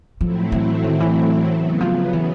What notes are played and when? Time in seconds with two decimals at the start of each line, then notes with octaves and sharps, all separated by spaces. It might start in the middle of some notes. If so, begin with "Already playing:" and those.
0.20 A2 F3 F#3 A3 C4 E4
0.52 E3
0.84 D#3
1.00 E3
1.49 C#3 F#3 B3
1.81 F3
2.13 E3